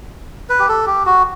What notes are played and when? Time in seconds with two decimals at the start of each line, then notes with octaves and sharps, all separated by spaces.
0.49 B4
0.59 G4
0.69 A4
0.86 G4
1.06 F#4